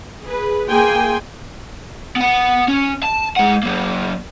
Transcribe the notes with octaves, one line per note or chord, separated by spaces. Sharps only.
G#4 B4
A#3 G#4 G5 G#5 C6
B3 F#5
C#4
A5
G#3 F#5
F#3 A#3